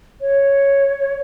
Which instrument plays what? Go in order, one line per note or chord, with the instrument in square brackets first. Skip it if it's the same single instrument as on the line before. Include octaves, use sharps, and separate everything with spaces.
[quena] C#5